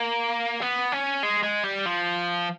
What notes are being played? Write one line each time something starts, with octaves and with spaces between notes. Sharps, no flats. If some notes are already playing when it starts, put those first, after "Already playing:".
Already playing: A#3
B3
C#4
G#3
G#3
G3
F3